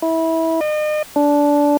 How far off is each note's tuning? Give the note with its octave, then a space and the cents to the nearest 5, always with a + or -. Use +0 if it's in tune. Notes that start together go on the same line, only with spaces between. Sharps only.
E4 -20
D#5 -40
D4 -15